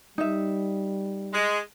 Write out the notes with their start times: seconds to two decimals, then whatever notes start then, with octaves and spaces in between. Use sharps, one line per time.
0.18 G3 D#4 E5
1.33 G#3